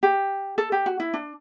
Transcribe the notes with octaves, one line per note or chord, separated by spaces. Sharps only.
G4
A4
G4
F#4
E4
D4